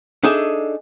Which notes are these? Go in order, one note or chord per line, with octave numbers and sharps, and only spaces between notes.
D4 D#4 G#4 A4 E5